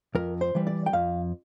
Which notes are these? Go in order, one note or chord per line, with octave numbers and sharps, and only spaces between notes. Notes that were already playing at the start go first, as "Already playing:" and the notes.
F2 A#4
C5
E3 G3
D5
G5
F2 F5